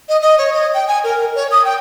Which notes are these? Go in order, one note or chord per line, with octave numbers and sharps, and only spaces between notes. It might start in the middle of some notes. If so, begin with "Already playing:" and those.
D#5
D#5
C#5
D#5
G5
G#5
A#4
C#5
D#6
G5